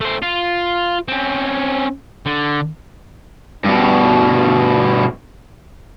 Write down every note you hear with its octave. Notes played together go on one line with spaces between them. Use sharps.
A3 C5
F4
C4 C#4
D3
G2 B2